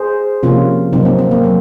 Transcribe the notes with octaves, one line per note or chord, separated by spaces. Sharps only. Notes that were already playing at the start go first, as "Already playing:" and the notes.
Already playing: G#4 C5
C3 F3 A#3 C#4 F4
C3 F#3 A#3 C4 D#4
C4
C4
A#3
F#3 A#3